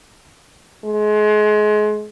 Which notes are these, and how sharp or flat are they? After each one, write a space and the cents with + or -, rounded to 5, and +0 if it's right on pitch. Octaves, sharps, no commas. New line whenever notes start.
G#3 +30